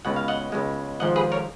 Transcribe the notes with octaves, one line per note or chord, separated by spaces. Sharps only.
C#2 B2 G#3 F#5
F5
D#5 F#5
C#2 B2 G#3
G#1 G#2 F3 D#5 F#5
G#4 B4
A#4 C#5